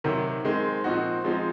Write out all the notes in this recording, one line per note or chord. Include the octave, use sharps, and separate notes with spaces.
C3 D#3 F#3
D#3 G#3 C4
A#2 F3 C4 D#4 F#4
F3 G#3 C4 D#4